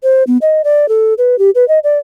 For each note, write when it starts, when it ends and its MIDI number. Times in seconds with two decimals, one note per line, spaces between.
0.03 0.24 72
0.27 0.38 59
0.42 0.62 75
0.64 0.89 74
0.89 1.14 69
1.18 1.38 71
1.39 1.50 67
1.55 1.67 71
1.68 1.79 75
1.84 1.99 74